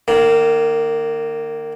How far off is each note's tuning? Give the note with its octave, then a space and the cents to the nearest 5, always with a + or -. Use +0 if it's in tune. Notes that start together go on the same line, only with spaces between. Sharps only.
D#3 -25 A#3 +0